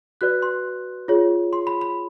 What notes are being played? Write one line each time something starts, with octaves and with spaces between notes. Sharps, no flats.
F#4 B4 D5 F#6
C6
F4 G#4 C#5
C6
B5
B5